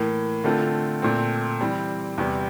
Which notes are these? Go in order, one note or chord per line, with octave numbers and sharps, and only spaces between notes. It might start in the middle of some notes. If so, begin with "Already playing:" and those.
Already playing: A2 E3 A#3
D3 A3 C4 F4
A#2 A3 C4
E3 G3 C4
E2 C3 G3 C4